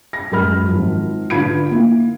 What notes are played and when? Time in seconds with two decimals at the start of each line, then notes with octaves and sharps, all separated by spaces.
0.13 A#6
0.32 F#2 G#3 A#4 B5 F6
0.68 G#1 F3
1.30 D3 F4 B4 B5 G#6 D7
1.71 A#3 E4